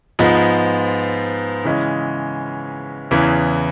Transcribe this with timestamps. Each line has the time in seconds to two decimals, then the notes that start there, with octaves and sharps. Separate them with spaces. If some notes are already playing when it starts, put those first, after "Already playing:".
0.19 G#2 F3 G#3 B3
1.65 C#3 E3 G#3 C#4
3.11 E2 C#3 E3